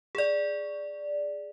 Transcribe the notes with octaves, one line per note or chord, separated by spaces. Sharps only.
G#4 D5